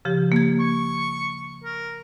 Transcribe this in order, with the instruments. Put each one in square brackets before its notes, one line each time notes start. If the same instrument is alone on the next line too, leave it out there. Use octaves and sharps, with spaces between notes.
[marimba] C#3 F3 G4
A#3 G#6
[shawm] C#6
A#4